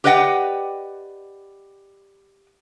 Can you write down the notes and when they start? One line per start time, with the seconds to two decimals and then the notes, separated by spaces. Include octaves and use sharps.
0.04 G4 B4 D5 D#5 F#5 G5